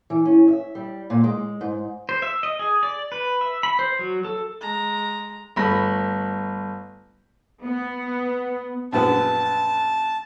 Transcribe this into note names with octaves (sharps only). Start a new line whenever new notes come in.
E3
C#4
E5
G3
A#2
G#3
G#2
C5
E5
D#5
G#4
D5
B4
E5
B5
C5
F#3
A4
G#3 A#5
G1 A3 B5 A#6
B3
A#1 F#2 B3 A5